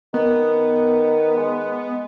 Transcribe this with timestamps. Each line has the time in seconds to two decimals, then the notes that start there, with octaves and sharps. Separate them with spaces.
0.14 D#3 B3
1.37 G#3